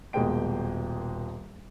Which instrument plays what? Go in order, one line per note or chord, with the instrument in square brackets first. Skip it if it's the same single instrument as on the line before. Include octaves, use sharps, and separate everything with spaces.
[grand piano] D#1 B2 G#3 A#3 G5 D7